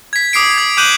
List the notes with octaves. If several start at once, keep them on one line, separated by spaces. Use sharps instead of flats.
G#6 B6
D6 D#6 B6 C7 D7
G#6
D6 F#6 G6 D#7 E7 F#7